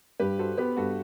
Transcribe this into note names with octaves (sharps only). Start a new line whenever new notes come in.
G2 G4 B4
F#4 A4 C5
B3 G4 B4
G2 F#4 A4